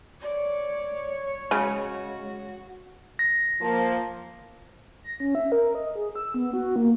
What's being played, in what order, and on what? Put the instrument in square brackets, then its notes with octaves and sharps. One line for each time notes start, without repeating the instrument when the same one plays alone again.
[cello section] C#5 [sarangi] D5
[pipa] C#3 [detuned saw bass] G#3 [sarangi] F#4
[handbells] A#6
[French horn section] F3 A#3
[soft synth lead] A#6
C#4
E5
A#4
D#5
G#4
E6
B3
F#4
A#3